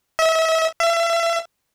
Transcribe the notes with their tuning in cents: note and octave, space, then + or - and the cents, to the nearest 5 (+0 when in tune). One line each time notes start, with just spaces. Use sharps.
E5 -35
E5 +35